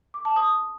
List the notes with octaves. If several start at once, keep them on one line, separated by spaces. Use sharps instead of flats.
D6
A5
D#6